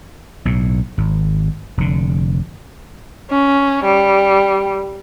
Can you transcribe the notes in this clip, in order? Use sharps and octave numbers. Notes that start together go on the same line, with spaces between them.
B1 A2
G#1
F1 D3
C#4
G3